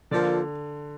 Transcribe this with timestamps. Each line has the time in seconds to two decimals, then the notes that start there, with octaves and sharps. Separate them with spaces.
0.11 D3 F3 A#3 F4 A4 D5